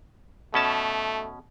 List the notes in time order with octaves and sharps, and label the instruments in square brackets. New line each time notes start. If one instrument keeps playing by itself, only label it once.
[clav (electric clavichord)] B2 C#4 A5 [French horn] A3